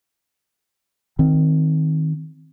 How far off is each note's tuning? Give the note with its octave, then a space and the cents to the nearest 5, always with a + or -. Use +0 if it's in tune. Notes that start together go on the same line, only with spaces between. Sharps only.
D#3 +10 C4 +0